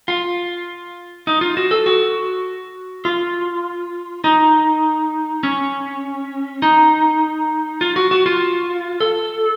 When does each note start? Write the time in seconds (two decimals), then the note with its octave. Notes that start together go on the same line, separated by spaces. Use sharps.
0.08 F4
1.27 D#4
1.41 F4
1.57 F#4
1.71 A4
1.86 F#4
3.05 F4
4.24 D#4
5.43 C#4
6.62 D#4
7.81 F4
7.96 F#4
8.11 F#4
8.26 F4
9.00 A4